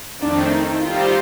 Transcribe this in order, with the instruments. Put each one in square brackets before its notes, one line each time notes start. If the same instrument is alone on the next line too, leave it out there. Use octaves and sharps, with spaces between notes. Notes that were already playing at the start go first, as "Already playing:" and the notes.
[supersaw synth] F2 D#3 A3 C4 [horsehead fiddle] D4
[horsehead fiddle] D#4
[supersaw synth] G3 C4 D#4 G4 C5 [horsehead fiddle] F4